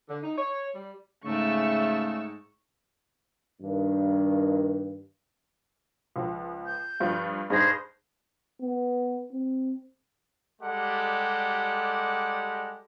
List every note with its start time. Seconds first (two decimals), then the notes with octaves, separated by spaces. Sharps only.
0.09 D3
0.23 D#4
0.38 C#5
0.74 G3
1.25 G#2 C#3 A3 C#6 E6
3.62 G2 D#3
6.16 C#2 F3
6.66 G6
7.00 G2 F3 F4
7.50 G2 D#4 G#4 C5 A#6
8.61 B3
9.32 C4
10.61 G3 G#3 G4 A4 D5 F#5